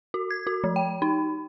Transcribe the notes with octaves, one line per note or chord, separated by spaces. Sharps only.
F#4
G#6
F#4
F3
G5
D#4